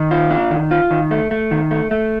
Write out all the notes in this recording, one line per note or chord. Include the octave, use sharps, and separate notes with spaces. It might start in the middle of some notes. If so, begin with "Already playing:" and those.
Already playing: D#3
F4
D4
D#3
F4
D#3
A3
A3
D#3
A3
A3